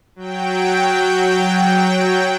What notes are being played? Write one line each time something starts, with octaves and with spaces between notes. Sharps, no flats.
F#3 G5